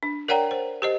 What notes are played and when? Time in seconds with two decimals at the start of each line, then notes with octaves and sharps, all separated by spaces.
0.03 D4
0.28 A#4 C#5 D5 F#5 G5 A#5
0.51 C5
0.82 G4 C5 D#5